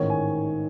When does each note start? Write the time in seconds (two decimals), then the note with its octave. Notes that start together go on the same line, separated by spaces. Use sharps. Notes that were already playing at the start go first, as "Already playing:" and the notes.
Already playing: A1 G#2 D#3 C#5
0.10 G#5